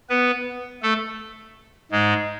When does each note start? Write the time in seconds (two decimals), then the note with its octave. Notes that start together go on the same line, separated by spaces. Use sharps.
0.09 B3 B4
0.82 A3 A4
1.91 G#2 G#3